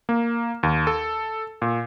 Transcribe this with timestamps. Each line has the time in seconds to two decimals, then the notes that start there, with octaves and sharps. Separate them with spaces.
0.09 A#3
0.63 D#2
0.87 A4
1.62 A#2